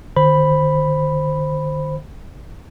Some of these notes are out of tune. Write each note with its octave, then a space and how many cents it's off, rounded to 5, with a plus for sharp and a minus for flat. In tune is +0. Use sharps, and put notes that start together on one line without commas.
D#3 -45 C5 +0 B5 +0